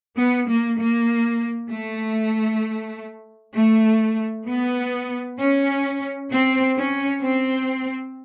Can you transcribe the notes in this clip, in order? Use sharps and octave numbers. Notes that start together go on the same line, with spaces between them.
B3
A#3
A#3
A3
A3
B3
C#4
C4
C#4
C4